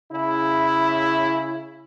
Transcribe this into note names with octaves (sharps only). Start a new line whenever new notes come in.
C#3 E4